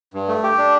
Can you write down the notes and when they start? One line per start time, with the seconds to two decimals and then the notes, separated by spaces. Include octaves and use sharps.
0.14 G2
0.28 A3
0.43 G4
0.58 D4